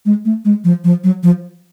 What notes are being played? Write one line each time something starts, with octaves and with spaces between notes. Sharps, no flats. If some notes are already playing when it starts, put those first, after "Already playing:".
G#3
A3
G#3
F3
F3
F#3
F3